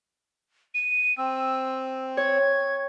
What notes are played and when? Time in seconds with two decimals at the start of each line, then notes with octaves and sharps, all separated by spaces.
0.74 D#7
1.18 C4 E6
2.17 C#5 G#6